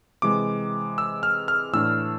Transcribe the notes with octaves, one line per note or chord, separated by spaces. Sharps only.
C3 E3 G#3 D6
E6
F6
F6
A2 E3 A3 D4 E6